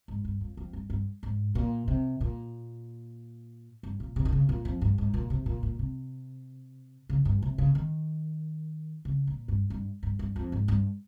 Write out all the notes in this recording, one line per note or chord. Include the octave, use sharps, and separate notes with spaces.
G#2
G2
F2
F2
G2
G2
G#2
A#2
C3
A#2
G2
A#2
C3
D#3
C#3
A#2
F2
G2
G#2
A#2
C3
A#2
A#2
C3
C#3
G2
C3
C#3
D#3
C#3
A#2
G2
G2
G2
G2
F2
G#2
G2